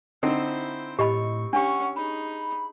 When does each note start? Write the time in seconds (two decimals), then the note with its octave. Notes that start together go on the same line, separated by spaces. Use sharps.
0.23 D3 C4 D#4 E4 C5
0.99 A2 G4 D#5 B5 C#6
1.53 C#4 D4 G4 F#5 C#6
1.96 D#4 G#4 B5